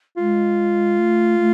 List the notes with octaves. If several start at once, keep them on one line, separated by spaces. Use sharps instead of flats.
G#3 F4
A3
A3